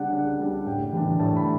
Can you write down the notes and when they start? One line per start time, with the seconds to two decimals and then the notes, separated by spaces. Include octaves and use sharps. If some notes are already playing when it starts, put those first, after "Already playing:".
Already playing: C#3 G3 D4 F#5
0.13 C#3 F#5
0.40 G3 D4
0.66 A2 G5
0.93 E3 G3 D4
1.19 A2 A5
1.36 B5